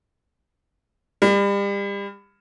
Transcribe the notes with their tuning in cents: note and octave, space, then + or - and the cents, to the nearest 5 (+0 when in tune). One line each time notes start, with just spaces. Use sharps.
G3 +35